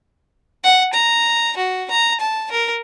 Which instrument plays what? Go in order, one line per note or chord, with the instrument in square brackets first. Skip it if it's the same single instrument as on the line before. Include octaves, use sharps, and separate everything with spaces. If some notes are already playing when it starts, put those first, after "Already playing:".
[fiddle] F#5
A#5
F#4
A#5
A5
A#4